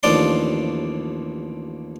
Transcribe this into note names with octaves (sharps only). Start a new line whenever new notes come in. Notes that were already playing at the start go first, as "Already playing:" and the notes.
A1 D#2 F3 D4 D5 C6